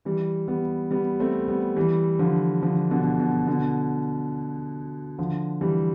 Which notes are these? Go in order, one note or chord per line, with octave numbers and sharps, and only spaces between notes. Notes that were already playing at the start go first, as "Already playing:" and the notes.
E3 G3
G3 B3
G3 B3
A3 C4
G3 B3
E3 G3
D3 F3
D3 F3
B2 D3
B2
B2 D3
D3 F3
E3 G3